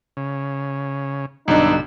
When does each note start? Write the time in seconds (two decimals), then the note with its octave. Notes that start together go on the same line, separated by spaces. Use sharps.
0.17 C#3
1.48 B1 G2 B2 D3 D4 D#4 E6